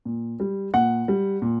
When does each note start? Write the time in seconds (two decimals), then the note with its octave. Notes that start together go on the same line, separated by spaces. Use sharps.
0.05 A#2
0.40 G3
0.74 A#2 F#5
1.08 G3
1.42 A#2